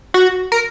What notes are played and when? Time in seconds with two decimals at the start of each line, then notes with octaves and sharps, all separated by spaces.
0.14 F#4
0.52 A#4